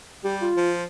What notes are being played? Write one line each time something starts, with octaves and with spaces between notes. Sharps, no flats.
G3 G4
F4
F3